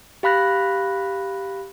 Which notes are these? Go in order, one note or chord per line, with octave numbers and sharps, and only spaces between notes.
G4 F5 B5 F#6 A#6